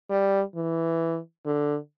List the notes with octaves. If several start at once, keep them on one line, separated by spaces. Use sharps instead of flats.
G3
E3
D3